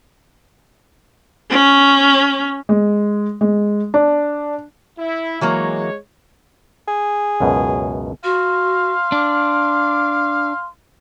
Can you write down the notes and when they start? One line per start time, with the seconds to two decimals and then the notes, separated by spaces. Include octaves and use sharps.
1.50 C#4
2.69 G#3
3.41 G#3
3.94 D4
4.99 E4
5.41 E3 F#3 G#3 A#3 C#5
6.88 G#4
7.41 C#2 F#2 B2
8.24 F#4 F5 C6
9.12 D4 D6